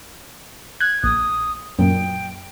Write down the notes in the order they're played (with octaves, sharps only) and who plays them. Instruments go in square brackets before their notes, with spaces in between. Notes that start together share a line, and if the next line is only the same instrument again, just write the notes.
[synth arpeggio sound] F#6 [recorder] G#6
[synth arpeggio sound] A#1 [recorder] D#6
[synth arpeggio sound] F#2 A#2 [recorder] G5